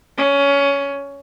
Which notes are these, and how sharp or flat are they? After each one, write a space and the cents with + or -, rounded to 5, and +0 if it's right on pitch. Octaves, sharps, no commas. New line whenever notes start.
C#4 +15